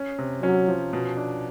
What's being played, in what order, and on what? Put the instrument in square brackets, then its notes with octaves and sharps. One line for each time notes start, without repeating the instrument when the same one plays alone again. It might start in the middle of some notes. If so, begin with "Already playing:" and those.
Already playing: [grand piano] C#4
C3
[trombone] F#3 [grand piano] C#4
[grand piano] F3
B2
D4